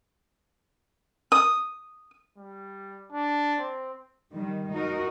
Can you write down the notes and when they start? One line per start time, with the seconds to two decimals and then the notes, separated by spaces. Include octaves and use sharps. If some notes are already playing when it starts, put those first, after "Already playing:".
1.32 D#6
2.37 G3
3.12 D4
3.60 C4
4.33 D#3 G3
4.73 D#4 F#4 A#4